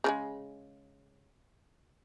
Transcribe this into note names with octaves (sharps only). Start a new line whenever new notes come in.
C#3 F3 G#3